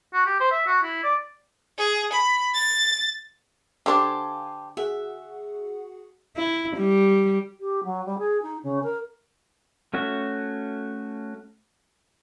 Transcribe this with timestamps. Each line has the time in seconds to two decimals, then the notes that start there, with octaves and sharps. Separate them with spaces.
0.13 F#4
0.26 G4
0.40 C5
0.51 E5
0.67 F#4
0.83 E4
1.04 D5
1.78 G#4
2.12 B5
2.55 A6
3.86 D3 D4 G4 C5 F5 G#5 A5
4.77 F#4 G#4 E5 F#5
6.36 E4
6.77 G3
7.60 G4
7.84 F#3
8.05 G3
8.18 G#4
8.42 D#4
8.63 C#3
8.83 A#4
9.94 A3 C#4 F#4 E5